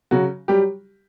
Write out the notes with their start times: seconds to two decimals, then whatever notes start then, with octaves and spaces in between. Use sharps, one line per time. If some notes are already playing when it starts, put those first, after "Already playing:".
0.11 C#3 F#3 F#4
0.48 F#3 G3 G4